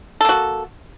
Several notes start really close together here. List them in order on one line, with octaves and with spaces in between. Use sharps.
A4 A#3 F#4